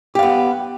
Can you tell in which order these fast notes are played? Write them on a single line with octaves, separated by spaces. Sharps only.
G4 F5 B3